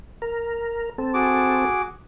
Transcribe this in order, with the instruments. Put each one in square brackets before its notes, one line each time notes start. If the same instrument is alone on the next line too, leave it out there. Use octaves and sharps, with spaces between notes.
[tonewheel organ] A#4
C4 A4
[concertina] F#4 G#4 D6